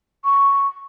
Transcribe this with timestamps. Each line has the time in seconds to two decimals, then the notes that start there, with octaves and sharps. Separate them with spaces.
0.25 C#6